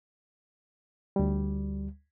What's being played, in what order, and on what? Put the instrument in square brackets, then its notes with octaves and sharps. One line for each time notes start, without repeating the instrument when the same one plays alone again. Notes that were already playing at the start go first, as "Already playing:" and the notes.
[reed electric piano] D2 G3